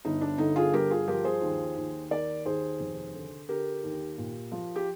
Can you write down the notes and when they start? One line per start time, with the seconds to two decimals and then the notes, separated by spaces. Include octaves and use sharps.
0.05 G1 D#4
0.21 D4
0.38 D3 D#4
0.56 F4 G#4
0.73 G2 G4 A#4
0.91 F4 G#4
1.08 F3 G4 A#4
1.25 G#4 C5
1.41 D#2
1.77 D#2
2.10 D#3 A#4 D5
2.45 D#2 G#4 C5
2.80 F1
3.14 D3
3.48 D3 G4 A#4
3.84 D#2
4.18 A#2
4.52 F3
4.76 G4